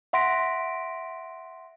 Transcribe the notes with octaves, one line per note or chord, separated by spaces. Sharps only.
E5 F#5 C6 A#6 B6 D7